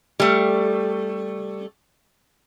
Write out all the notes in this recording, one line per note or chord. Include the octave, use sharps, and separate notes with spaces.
G3 A3